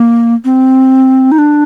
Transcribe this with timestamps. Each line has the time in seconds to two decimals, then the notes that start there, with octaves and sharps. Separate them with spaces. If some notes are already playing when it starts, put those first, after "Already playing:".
Already playing: A#3
0.45 C4
1.32 D#4
1.38 D4